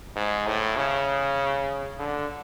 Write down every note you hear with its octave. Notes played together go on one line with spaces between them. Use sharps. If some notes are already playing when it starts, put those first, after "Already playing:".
G#2
A2
C#3
D3